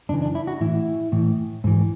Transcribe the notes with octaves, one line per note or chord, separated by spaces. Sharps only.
F#2 C#3 E3 D4
D4
E4
F#4
A2 E3 E4
A2 E3
G#2 E3